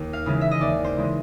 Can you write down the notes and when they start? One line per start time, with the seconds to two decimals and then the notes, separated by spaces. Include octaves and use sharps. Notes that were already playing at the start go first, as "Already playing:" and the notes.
Already playing: D#2
0.13 F5
0.26 C#3 E3 G#3
0.41 E5
0.51 D#5
0.61 D#2 D5
0.84 C5
0.96 C#3 E3 G#3